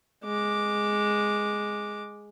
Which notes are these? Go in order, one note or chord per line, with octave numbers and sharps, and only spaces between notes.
G#3 D6